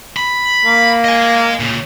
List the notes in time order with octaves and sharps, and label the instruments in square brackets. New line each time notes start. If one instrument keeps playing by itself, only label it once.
[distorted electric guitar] B5
[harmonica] A#3
[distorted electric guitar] D#5 G#5
A#2 C#3